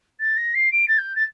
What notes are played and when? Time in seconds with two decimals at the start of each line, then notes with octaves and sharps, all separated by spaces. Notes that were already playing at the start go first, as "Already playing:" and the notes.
0.20 A6
0.37 A#6
0.54 C7
0.72 D7
0.88 A6
0.98 G6
1.16 A6